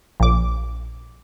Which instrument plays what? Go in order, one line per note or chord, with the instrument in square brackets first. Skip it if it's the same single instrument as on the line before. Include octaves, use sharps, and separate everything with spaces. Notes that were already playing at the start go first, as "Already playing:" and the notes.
[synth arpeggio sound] A#1 D6